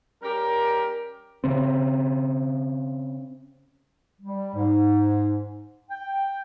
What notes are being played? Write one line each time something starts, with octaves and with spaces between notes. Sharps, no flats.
G3 C#4 G4 A#4
C#3 C4
G3
G#2
G5